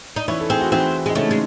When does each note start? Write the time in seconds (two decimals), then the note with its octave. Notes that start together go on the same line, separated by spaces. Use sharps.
0.16 D#4
0.28 E3 C#4 E4
0.40 A4
0.50 C4 G#4
0.61 F#4
0.72 E3 C4 E4
1.06 G#3 D#4
1.15 C#3 A3 C#4
1.31 G#3